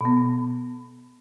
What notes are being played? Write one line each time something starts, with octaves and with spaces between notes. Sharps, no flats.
B2 B3